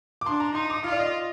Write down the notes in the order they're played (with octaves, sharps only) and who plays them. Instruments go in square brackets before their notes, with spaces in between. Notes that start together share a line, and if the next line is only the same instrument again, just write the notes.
[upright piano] D6
[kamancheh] D4 [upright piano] C6
[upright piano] A#5
[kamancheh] D#4 [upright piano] C6
[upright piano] D6
[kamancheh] F4 [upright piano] F5
[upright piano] D5
D#5